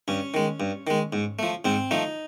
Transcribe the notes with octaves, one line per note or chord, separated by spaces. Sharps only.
G2 C#4
D#3 G#3
G2
D#3 G#3
G#2
F3 A3
G#2 C4
F3 A3 D#4